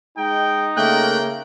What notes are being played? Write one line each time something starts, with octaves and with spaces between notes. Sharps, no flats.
G#3 D#4 G5
C#3 A3 A#3 A#4 G5 F#6